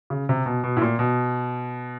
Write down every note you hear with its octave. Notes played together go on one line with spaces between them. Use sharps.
C#3
C3
B2
B2
A2
A#2
B2